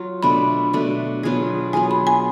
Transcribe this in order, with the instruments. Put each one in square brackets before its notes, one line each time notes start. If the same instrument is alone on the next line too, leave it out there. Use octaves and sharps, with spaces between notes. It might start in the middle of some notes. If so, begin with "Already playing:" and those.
Already playing: [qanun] F#3 F4
[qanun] B2 A3 D4 [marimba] B5
[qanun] B2 A3 D4
F#3 B3 F4 G#4
[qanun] F#3 B3 F4 G#4 [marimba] G#5
[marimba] B5
G#5